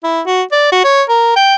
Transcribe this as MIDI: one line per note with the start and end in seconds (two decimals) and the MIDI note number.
0.04 0.21 64
0.26 0.42 66
0.52 0.71 74
0.72 0.84 66
0.84 1.02 73
1.09 1.31 70
1.36 1.55 79